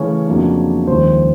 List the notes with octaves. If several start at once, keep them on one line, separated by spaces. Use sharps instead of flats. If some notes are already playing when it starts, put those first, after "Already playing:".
Already playing: C#3 E3 A3 C#4 C#5
F2 C#3 F#3 A#3 D4
D#2 C#3 F3 G#3 C5